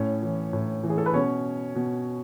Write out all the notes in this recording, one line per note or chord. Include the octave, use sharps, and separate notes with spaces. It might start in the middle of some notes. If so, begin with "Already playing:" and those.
Already playing: A2 C#4 C#5
E3
A2
E3
G#4
A4
B4
B2 C#4 C#5
B2